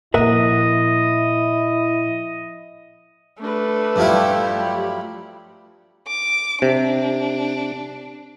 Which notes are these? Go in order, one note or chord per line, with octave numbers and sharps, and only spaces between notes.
A#2 F3 E4 A#4 D#5 E5 F#5
A3 D4 B4
G2 F3 G3 E4 G4
F#3 B5
D6
C3 D4